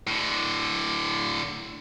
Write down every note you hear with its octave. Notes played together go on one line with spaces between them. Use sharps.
A2 D3